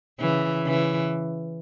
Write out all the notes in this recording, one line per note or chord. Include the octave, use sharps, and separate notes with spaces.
C#3 E3
C#3 E3